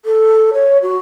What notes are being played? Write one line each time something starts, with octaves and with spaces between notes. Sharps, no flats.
A4
C#5
F#4